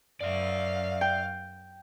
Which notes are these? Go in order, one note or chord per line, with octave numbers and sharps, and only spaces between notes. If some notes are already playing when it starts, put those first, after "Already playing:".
F#2 D5 E5 F5
G5